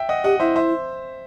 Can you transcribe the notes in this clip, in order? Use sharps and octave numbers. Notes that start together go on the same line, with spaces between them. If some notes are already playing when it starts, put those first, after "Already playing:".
Already playing: E5 G5
D#5 F#5
G4 D#5 F#5
E4 C5 E5
C5 E5